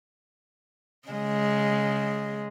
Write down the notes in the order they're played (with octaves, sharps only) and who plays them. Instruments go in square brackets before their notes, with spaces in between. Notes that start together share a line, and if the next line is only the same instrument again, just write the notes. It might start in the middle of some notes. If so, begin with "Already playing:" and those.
[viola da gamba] C#3 G#3